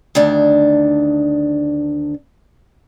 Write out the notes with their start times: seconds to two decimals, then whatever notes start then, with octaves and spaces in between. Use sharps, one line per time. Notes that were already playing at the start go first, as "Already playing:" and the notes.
0.15 D2 D#3 D4